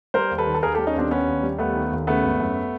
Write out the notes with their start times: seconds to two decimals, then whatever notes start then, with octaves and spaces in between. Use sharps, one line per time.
0.14 G3 A#4 C5
0.31 D#2
0.38 A4 B4
0.47 D#3
0.55 A4
0.62 D#2 G#4 A#4
0.74 G4 A4
0.78 G3
0.87 C#4 D#4
0.95 D#2 C4 D4
1.10 D#3 B3 C#4
1.27 D#2
1.43 G3
1.59 D#2 A3 B3
1.74 D#3
1.91 D#2
2.07 C#3 A3 B3
2.24 G#1
2.40 F#2